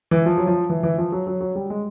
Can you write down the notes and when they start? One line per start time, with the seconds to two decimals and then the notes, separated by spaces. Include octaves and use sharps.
0.11 E3
0.26 F3
0.38 F#3
0.47 F3
0.69 E3
0.83 E3
0.98 F3
1.12 F#3
1.27 F#3
1.41 F#3
1.55 G3
1.70 G#3